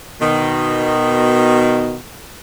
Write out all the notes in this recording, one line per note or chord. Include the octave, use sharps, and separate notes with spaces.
B2 D#3